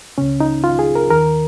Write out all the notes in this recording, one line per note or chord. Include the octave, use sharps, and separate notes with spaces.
C#2 C#3 C#4
D#4
F4
G#4
A#4
D#2 D#3 A#4